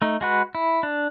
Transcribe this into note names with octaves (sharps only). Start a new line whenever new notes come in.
A3 D#4
G#3 F#4 B4
E4
D4